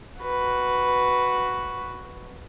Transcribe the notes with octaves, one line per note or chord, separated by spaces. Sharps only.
F#4 B4